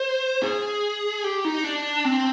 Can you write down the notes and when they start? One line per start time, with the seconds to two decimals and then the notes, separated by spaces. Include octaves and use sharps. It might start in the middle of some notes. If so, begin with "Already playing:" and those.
Already playing: C5
0.43 G#4
1.24 G4
1.45 D#4
1.64 D4
2.05 C4